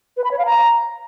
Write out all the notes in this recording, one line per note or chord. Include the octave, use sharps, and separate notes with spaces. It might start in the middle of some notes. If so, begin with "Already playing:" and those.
B4
B5
C#5
F5
A#5